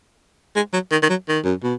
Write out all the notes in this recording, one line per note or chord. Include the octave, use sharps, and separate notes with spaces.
G#3
F#3
D#3
D#3
F#3
D#3
F#2
B2